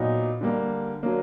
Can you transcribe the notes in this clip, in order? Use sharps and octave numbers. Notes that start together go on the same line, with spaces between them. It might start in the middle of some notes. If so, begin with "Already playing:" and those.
Already playing: A#2 F#3 B3 D#4
D3 G3 A#3
D3 F#3 A#3